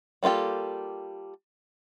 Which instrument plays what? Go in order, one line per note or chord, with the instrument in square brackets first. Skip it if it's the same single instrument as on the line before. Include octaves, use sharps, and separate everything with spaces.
[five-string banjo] G3 A#3 F4 G4 A4